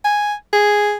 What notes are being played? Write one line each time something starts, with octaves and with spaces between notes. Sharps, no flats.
G#5
G#4